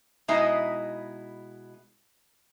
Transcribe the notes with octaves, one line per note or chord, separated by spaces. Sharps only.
B2 G#3 D#4 E4 D#5 E5